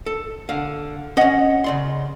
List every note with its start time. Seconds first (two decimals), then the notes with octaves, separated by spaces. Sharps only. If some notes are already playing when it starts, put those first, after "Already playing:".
0.06 A4
0.49 D3 F5
1.17 C#4 C#5 D#5 F#5
1.64 C#3 D5 C6